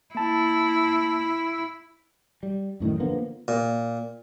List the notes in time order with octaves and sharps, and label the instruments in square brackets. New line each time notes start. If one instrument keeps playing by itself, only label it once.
[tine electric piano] A#3 A5 [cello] E4
[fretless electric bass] G3
F#2 A2 C3 D#3
D3 F3 A#3 B3
[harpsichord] A#2